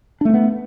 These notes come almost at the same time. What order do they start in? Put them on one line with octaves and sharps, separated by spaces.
D4 A3 C#4 B3